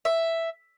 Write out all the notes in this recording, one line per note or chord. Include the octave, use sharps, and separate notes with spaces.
E5